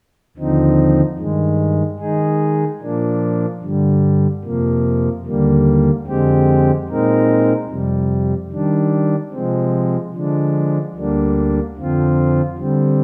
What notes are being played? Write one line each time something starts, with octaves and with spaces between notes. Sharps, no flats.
D#2 D3 F3 C4 D#4
G2 D#3 G#3
D#3 G#3 D#4 G#4
A#2 F3 A#3 D4
G2 D3 G3
F2 C3 F3 A#3
D#2 D3 G3 A#3
F2 D3 G#3 C4 G4
A#2 G#3 C4 D#4 A#4
F2 C3 G3
D#3 G3 D4
C3 F3 G#3 C4
D3 F3 G#3 D4
D2 D3 G3 A#3 D4
F2 D3 F3 C4 F4
D3 G3 C4